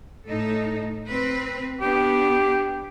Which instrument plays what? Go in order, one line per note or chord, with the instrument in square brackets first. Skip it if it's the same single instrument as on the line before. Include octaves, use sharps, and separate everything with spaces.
[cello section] A2 D#4 A4
C4 B4
[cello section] B3 D4 [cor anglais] G4